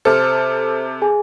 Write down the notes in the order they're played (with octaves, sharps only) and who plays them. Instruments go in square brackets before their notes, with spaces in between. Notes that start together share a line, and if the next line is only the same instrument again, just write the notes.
[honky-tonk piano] C3 A4 [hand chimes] C5 F6
[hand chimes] G#4 G#5